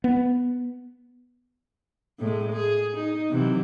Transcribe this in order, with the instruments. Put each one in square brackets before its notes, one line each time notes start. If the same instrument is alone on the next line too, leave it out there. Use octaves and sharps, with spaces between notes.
[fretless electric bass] B3
[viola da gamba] A2 G#3
G#4
D#4
C3 E3 F#3